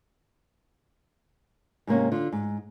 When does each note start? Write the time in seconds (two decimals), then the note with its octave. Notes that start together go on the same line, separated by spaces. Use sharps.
1.87 G#2 C3 A#3 C#4
2.12 D3 F4
2.32 G#2